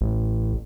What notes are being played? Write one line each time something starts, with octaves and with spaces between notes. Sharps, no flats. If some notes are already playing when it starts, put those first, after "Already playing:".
A1